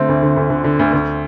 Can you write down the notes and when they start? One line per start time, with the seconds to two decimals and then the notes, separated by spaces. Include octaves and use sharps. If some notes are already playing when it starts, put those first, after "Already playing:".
Already playing: D3 A3 C4
0.08 D2
0.22 D3
0.36 D2
0.50 D3
0.64 D3
0.79 D2
0.93 D2